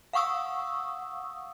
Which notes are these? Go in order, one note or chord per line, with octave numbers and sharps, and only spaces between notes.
F5 F#5 C#6 D#6 E6